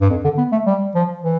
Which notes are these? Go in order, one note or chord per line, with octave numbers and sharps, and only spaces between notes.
G2
F2
D3
B3
A3
G3
F3
E3